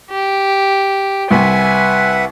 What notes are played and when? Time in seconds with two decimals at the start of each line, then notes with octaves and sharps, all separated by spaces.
0.10 G4
1.31 C2 B4 E5 F#5 G#5